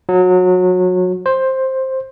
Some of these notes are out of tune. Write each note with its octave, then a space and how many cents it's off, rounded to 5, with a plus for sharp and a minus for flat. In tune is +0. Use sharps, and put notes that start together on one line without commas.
F#3 -25
C5 +10